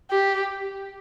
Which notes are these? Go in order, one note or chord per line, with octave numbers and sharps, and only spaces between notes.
G4